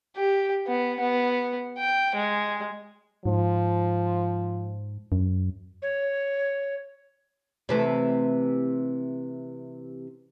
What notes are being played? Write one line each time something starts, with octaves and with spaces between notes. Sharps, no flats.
G4
B3
B3
G5
G#3
G#2 F3
F#2
C#5
C3 E3 A3